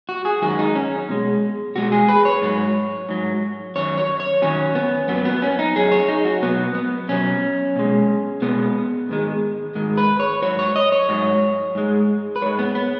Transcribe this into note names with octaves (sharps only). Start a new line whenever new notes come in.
F#4
G#4
F#2 D#3 G#3 F#4
D#4
C#4
B2 G#3
B2 G#3 F#4
G#4
B4
C#5
G#2 F#3
G#2 F#3
F#2 D#3 F#3 C#5
C#5
C#5
F#2 D#3 F#3 C#4
B3
F#2 F#3 B3
B3
C#4
D#4
F#2 F#3 G#4
C#5
D#4
F#4
B2 F#3 B3
B3
B2 F#3 C#4
B2 G#3
B2 G#3 B3
G#2 D#3 G#3
G#2 D#3 G#3
B4
C#5
G#2 F#3 C#5
C#5
D#5
C#5
G#2 F#3
G#2 G#3
B4
G#2 G#3 C#5
B3
B3